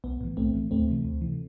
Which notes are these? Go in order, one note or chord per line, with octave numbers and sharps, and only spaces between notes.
B1 B3
A2 E3
B1 A3 C4
A2 E3
D2 A3 C4
C3 E3
D2
C3 E3